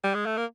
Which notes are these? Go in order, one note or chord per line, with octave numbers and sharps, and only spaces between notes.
G3
G#3
A3
A#3